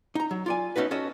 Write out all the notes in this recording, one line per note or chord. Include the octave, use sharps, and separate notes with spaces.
D#4 A#5
F#3
F4 D5 G#5
A3 C#4 D#4 F#4 B4
C#4 F#4 A4 D#5 A5